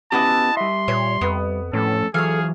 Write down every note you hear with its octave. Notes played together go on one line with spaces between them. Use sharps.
B3 C#4 E4 F#4 G4 D#5 A5
G3 E5 C6
A#2 C#5
F2 B3
F2 A2 A3 C#4 A4
E3 F#3 G#4 A4 C#5 F5